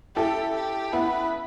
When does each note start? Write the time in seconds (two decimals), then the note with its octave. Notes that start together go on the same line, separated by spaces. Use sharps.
0.16 E4 G4 A4
0.55 G4
0.92 B3 E4 B4